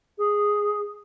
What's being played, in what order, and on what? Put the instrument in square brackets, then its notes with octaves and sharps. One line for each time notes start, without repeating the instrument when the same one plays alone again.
[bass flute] G#4